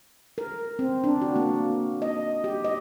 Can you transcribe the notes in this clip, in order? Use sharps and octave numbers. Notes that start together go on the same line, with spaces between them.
A#4
C4
D4
F#4
A#3
D#5
G4
D#5